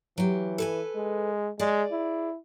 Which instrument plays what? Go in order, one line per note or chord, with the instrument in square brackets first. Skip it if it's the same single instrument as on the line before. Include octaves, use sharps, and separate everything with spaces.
[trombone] E3 [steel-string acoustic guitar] F#3 G4
[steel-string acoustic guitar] A4 B4 G#5
[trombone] G#3
[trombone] G#3 [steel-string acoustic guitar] G#4 D5
[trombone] E4